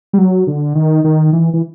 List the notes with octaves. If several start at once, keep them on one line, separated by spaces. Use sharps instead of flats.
G3
F#3
D3
D#3
D#3
E3
E3